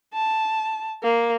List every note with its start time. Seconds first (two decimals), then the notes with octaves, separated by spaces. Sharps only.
0.14 A5
1.03 A#3